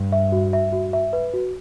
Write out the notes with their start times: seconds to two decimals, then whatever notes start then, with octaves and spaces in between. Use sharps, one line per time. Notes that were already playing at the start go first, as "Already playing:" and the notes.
Already playing: G2
0.12 E5
0.32 F#4
0.53 E5
0.72 F#4
0.93 E5
1.13 B4
1.33 F#4